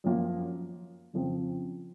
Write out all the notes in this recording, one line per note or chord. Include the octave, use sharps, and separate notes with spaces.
F#2 F3 A#3 F4
F2 C#3 F3 C4